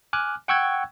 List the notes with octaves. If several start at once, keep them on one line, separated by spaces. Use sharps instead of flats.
G#5 D6 F6 F#6
F#5 G5 C#6 E6 F#6 G#6